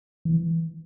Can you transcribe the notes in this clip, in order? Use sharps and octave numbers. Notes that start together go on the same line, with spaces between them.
E3